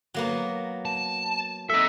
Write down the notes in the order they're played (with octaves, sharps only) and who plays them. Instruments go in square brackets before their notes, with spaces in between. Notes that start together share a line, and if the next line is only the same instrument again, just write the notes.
[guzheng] F#3 A#3 B3
[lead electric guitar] A5
[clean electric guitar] D#4 E5 [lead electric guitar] A4 D#5